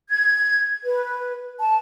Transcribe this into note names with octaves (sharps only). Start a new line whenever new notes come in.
G#6
B4
A5